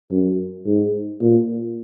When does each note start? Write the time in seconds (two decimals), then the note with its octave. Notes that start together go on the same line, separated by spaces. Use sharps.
0.11 F#2
0.66 G#2
1.21 A#2